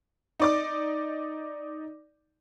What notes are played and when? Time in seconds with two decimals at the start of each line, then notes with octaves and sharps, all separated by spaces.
0.40 D#4 D5 D6